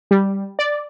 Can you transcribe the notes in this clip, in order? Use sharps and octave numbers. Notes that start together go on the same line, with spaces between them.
G3
D5